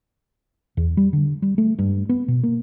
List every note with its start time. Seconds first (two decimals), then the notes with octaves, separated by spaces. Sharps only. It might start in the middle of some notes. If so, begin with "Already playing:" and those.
0.77 E2
0.97 G3
1.13 D3
1.42 G3
1.58 A3
1.79 G2
2.09 B3
2.28 B2
2.43 A#3